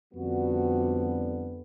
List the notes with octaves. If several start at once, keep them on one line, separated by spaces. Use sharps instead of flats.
F2 D3 G3 B3 F#4